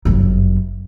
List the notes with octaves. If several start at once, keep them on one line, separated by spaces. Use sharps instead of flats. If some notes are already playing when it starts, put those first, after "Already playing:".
G1 F#2